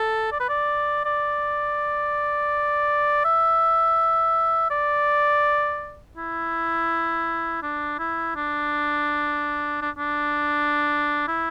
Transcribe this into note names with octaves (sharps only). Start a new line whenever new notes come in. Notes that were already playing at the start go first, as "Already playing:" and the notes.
Already playing: A4
D5
B4
D5
D5
E5
D5
E4
D4
E4
D4
D4
D4
E4